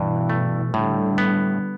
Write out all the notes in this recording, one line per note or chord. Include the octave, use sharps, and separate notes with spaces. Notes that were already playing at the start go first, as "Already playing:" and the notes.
Already playing: G2 B2 E3
A3
A2 D3 G3
B3